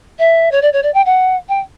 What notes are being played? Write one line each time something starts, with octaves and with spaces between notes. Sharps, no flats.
E5
C#5
D5
C#5
D5
G5
F#5
G5